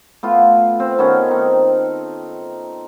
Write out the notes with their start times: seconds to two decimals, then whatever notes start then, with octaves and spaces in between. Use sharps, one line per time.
0.23 A3 B3 F4
0.80 C4
0.99 D#3 B3 C#4
1.28 C4 D#4